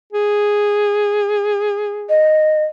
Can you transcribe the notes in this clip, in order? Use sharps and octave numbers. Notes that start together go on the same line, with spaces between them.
G#4
D#5